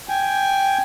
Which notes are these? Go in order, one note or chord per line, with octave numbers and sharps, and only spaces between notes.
G5 G#5